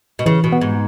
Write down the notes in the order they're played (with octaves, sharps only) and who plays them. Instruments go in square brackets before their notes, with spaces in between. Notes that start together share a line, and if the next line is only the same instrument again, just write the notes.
[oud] B2
[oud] C#3 [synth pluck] E3
[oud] B2
[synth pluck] B3
[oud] G#2